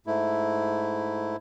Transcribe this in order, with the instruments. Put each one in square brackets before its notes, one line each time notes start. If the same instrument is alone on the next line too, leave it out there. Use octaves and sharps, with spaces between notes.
[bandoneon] G#2 A3 E4